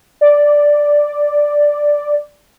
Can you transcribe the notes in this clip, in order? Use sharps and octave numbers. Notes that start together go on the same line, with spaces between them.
D5